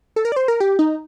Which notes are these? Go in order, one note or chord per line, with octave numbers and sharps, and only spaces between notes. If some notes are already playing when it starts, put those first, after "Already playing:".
A4
A#4
D5
C5
A#4
G4
D#4